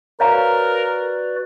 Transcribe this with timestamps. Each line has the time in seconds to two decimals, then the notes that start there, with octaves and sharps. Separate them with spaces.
0.20 F#4 A#4 B4 C#5 D5 F5 A#5